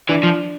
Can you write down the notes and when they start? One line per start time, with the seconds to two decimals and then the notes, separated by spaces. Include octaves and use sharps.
0.09 E3 D4
0.23 F3